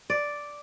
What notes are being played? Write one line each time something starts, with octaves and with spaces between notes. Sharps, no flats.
D5